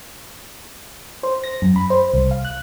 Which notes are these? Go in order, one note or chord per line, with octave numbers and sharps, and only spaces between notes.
C5
A#6
F#2
B5
C5
C2
F5
F#6